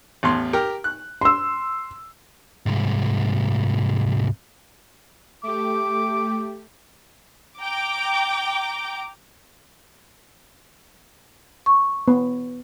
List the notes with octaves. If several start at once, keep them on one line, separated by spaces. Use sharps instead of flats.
A1 E2 C6
G4 A#4 G5
F#6
C6 E6
C2 G#2
A3 G4 D6
G5 A#5 D6
C#6
B3